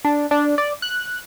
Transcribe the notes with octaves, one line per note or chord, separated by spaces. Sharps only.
D4
D4
D5
F#6